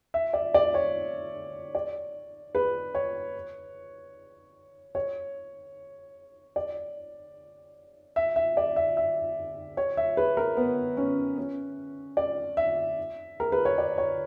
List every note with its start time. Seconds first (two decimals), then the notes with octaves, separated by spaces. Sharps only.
0.14 E5
0.33 D5
0.54 D5
0.74 C#5
1.75 D5
2.55 B4
2.95 C#5
4.95 C#5
6.56 D5
8.16 E5
8.36 E5
8.57 D5
8.76 E5
8.97 E5
9.77 C#5
9.97 E5
10.17 B4
10.37 A#4
10.57 B3
10.97 C#4
11.38 C#4
12.17 D5
12.57 E5
13.40 A#4
13.52 B4
13.65 C#5
13.78 D5
13.98 C#5